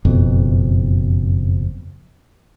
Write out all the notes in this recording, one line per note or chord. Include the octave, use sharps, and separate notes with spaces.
F#1 F2 B2